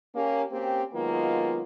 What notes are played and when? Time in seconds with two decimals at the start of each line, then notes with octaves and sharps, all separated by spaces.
0.15 A#3 C#4 G4
0.52 A#3 C4 C#4 G4
0.93 D#3 F#3 G#3 A#3 B3 F4